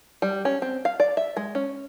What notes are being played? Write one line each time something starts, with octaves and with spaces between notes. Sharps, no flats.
G3
C#4
C4
F5
D5
E5
G#3
C#4